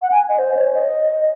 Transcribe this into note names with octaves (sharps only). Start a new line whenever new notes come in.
F#5
G#5
D#5
C5
C#5
D#5